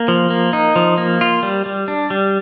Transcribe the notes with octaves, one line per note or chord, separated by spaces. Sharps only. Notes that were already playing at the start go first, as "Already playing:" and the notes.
Already playing: A#3
F3
A#3
D#4
F3
A#3
F4
G3
G3
D4
G3